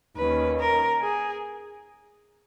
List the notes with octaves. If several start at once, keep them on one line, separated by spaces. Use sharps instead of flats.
D#2 D#3 A#3 C#4 B4
A#4
G#4